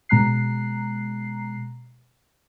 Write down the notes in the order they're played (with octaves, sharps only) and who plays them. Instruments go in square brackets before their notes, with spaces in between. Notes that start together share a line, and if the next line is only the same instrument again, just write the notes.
[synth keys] B2 G#3 A#5 F#6 C7